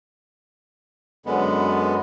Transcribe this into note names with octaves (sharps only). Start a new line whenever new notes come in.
F#2 D3 G#3 B3